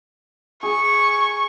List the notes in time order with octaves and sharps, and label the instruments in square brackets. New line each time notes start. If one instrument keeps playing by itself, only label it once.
[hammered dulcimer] G#4 [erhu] C#6